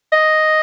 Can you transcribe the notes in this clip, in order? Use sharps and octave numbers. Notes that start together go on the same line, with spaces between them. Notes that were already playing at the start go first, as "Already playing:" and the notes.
D#5